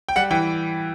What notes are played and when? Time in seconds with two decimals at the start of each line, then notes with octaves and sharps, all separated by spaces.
0.09 G5
0.16 G3 F#5
0.31 E3 G5